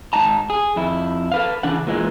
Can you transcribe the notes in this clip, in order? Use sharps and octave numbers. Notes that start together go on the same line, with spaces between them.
G#2 D#4 A5 A#5
G#4
F2 E4
A4 B4 F5
C#3 E3 D4 F#5
A#2 E3 G#3